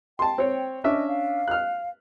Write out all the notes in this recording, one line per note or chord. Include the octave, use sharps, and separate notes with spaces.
G5 A5 C6
C4 C#5
C#4 D4 D#5 E5
F5
F6 F#6